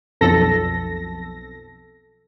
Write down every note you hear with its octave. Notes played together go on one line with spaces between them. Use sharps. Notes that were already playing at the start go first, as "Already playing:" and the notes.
B1 F2 A4 A#6